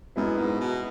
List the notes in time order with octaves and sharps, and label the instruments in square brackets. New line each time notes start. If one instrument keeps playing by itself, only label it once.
[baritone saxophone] F#2 [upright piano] G#3 B3 E4 B4
[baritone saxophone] G#2
B2